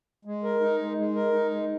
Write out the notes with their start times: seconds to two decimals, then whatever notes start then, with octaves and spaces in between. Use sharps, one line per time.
0.25 G#3
0.44 A#4
0.61 D#4
0.79 G#3
0.97 G#3
1.15 A#4
1.33 D#4
1.51 G#3